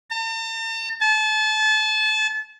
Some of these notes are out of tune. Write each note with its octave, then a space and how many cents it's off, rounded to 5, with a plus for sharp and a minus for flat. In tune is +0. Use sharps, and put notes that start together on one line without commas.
A5 +45
A5 -30